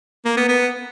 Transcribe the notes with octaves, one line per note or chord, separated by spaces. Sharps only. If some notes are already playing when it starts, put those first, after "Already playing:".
A#3
B3
B3